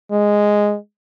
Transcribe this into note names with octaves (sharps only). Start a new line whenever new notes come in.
G#3